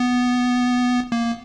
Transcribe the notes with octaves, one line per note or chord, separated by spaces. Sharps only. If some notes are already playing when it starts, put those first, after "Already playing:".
Already playing: B3
A#3